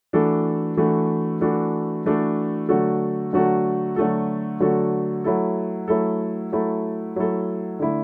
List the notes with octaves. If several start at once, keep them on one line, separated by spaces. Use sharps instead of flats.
E3 A3 D4 F#4 A4
E3 A3 D4 F#4 A4
E3 A3 D4 F#4 A4
E3 A3 D4 F#4 A4
D3 F#3 A3 F#4 A4
D3 F#3 A3 F#4 A4
D3 F#3 A3 F#4 A4
D3 F#3 A3 F#4 A4
F#3 A3 E4 A4
F#3 A3 E4 A4
F#3 A3 E4 A4
F#3 A3 E4 A4
D3 A3 E4